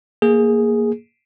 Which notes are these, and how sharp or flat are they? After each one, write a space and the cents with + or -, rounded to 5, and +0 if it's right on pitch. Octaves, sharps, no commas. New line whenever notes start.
A#3 +0 G#4 +0